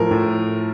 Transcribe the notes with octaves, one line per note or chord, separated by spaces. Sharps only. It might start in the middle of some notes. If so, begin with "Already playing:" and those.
Already playing: A2 F3 A#4
A2